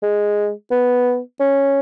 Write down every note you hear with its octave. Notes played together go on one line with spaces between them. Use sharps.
G#3
B3
C#4